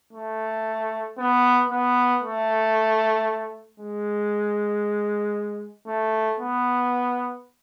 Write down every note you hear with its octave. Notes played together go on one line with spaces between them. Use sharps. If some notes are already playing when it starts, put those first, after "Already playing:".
A3
B3
B3
A3
G#3
A3
B3